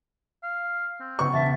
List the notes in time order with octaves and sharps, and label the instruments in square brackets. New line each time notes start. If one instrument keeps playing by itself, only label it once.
[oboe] F5
C4
[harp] C#3 B3 [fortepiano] C#6
[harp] E1 [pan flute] E5 [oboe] A5